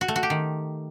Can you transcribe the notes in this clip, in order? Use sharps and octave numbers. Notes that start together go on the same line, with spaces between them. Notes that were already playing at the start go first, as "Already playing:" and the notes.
F#4
A3
F#4
G4
D#3